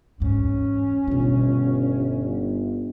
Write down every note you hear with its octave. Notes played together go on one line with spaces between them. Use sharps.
E2 G#2 C#4
G1 B2 F4